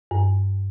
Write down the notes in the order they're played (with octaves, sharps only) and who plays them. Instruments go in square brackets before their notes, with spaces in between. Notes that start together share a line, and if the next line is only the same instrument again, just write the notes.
[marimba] G2